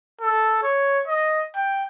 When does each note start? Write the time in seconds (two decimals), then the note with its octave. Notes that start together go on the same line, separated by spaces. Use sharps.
0.21 A4
0.63 C#5
1.08 D#5
1.56 G5